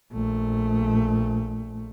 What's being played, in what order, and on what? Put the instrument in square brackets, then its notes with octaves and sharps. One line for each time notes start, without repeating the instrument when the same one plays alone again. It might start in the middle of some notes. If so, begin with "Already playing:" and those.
[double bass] A#1 A3